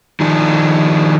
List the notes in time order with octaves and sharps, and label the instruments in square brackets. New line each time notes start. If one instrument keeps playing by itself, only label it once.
[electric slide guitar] D#3 F3 D4